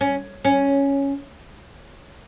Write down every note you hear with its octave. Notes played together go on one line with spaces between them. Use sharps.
C#4
C#4